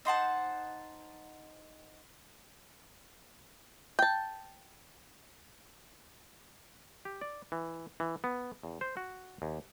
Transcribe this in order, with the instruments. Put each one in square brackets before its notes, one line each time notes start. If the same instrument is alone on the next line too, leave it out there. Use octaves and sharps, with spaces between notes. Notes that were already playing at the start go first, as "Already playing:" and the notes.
[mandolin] D#4 C5 F#5 A5
[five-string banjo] G5 A5
[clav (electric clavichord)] G4
D5
E3
E3
B3
E2
C5
F#4
D#2